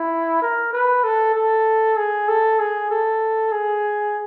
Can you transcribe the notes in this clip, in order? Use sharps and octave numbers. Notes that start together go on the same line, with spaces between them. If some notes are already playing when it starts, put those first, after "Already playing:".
Already playing: E4
A#4
B4
A4
A4
G#4
A4
G#4
A4
G#4